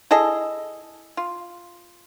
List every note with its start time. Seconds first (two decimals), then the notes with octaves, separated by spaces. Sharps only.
0.11 E4 G#4 A4 D#5
1.17 F4